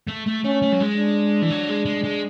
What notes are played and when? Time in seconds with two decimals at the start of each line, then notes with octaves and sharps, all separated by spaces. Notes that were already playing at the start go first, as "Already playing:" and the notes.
0.08 A3
0.27 A3
0.44 A3 C#4
0.62 A3
0.72 F#3
0.80 G#3
0.97 D4
1.42 E3
1.50 F#3
1.68 G#3
1.85 G#3
2.04 G#3